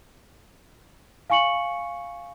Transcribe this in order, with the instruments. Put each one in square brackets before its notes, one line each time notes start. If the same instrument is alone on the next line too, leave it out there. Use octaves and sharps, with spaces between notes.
[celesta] F5 G#5 C#6 C#7 F#7